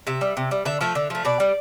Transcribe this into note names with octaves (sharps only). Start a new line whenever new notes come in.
C3 E5
G3
C3
G3
D3 E5
F3 A3 E5
D3
F3 A3
B2 D5
G3